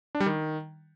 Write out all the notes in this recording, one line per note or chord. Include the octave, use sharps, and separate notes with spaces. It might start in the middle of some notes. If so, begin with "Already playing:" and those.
D4
G3
D#3